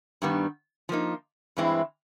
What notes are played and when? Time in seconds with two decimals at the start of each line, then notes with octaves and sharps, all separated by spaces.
0.22 G2 D#3 G3 B3
0.89 F3 A#3 D#4
1.57 G2 E3 G#3 C4 E4